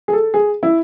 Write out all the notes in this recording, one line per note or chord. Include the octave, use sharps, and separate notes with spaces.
G#4
A4
G#4
E4